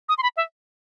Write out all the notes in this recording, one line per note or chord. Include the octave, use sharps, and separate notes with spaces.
D#6
C6
B5
E5